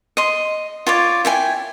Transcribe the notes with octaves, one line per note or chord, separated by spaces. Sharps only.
D#5 C6
F4 C#5 D5
E4 G5 G#5